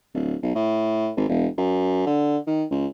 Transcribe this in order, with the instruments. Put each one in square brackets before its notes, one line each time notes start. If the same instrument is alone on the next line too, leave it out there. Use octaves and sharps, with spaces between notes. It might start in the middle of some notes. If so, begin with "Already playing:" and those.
[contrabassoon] D1
B1
A2
G#1
E1
F#2
D3
D#3
C#2